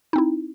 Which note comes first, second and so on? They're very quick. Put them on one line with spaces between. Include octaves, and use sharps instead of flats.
D#4 C4 E4